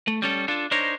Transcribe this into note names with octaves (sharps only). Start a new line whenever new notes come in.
A3
G3 C#4 A4
D4 F4 A4
D4 D#4 A#4 C5 C#5